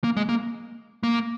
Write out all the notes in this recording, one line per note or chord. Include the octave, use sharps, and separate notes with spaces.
A#3
G#3
A#3
A#3